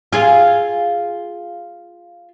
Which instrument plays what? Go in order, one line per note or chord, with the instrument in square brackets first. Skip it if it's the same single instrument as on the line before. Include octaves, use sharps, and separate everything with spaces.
[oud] F4 G#4 F5